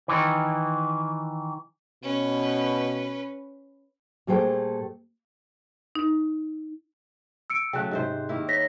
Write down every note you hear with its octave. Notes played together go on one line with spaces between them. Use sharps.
D#3 E3
B2 C#4 B4
A#2 G3 A3 G#4 C5 G5
D#4
E6 C#7 D7
C#3 F#3 A3 G5 F#6
G#2 C3 C5
D#3 A#3 E4
C#5 A#6 B6